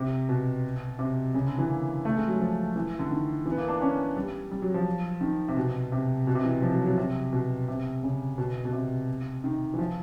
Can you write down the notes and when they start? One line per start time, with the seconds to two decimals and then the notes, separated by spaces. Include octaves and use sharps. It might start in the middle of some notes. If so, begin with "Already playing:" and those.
Already playing: C3
0.29 B2
0.99 C3
1.34 C#3
1.46 D3
1.58 E3
1.69 A#3
2.05 A3
2.17 G#3
2.28 F#3
2.40 F3
2.76 E3
2.99 D3
3.10 D#3
3.46 E3
3.52 B3
3.58 A#3
3.68 D4
3.81 C#4
4.16 G3
4.51 G3
4.62 F#3
4.74 F3
5.21 D#3
5.48 C3
5.57 B2
5.92 C3
6.27 B2
6.35 C3
6.44 E3
6.62 F3
6.74 F#3
6.86 F#3
6.98 C3
7.33 B2
7.68 C3
8.03 C#3
8.38 B2
8.65 B2
8.73 C3
9.44 D#3
9.74 E3
9.79 F3